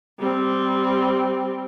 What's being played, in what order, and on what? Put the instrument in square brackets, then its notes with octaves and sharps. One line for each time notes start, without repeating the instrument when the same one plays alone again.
[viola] G3 C4